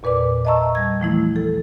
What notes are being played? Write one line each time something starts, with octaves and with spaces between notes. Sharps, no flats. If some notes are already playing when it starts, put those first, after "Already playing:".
E2 A#2 B4 D5 D6
D#5 E5 A5 A#5 C#6 E6
G3 G#6
E3 F3 A3 E4
A4